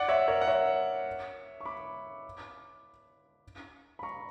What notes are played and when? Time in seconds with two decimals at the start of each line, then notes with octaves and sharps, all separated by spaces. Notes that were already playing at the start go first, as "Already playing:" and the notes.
Already playing: D5 F#5
0.08 C#5 E5
0.28 A#4 C#5
0.41 F#5
0.47 C#5 E5
1.61 C#6
1.65 B5 D6
3.99 B5
4.03 A#5 C#6